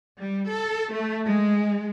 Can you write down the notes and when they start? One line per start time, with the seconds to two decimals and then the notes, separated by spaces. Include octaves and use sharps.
0.18 G3
0.50 A4
0.92 A3
1.25 G#3